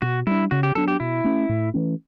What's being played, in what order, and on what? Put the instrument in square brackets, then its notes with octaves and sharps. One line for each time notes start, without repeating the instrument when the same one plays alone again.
[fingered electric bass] B2 [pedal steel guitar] F#4
[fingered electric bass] G3 D4 [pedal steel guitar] E4
[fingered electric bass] C#3 [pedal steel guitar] F#4
[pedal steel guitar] G4
[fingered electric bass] F#3 B3 D4 [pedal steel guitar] A4
[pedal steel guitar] G4
[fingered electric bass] B2 [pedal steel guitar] E4
[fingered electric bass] A3 C#4
A2
E3 A3 C#4